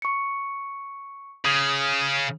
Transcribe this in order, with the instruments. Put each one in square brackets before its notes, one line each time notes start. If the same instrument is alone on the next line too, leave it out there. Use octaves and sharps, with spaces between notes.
[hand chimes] C#6 C#7
[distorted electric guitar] C#3 [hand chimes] D#6 G#6